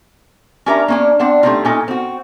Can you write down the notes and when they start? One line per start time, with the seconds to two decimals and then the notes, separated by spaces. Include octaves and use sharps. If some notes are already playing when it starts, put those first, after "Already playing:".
0.66 C#4 D4 G4 A#4 E5 A#5
0.88 A#3 C#4 D4
1.19 C4 D4 F#5 A5
1.43 G3 A3 C4 D4 D#4 F4
1.65 A#2 C#4 D#4 A4
1.88 C4 F#4